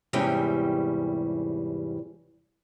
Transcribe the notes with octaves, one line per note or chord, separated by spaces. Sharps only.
E2 G#2 C3 E3 G3 C#4